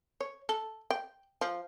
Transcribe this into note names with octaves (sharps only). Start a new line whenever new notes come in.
C#5
A4
G5
F3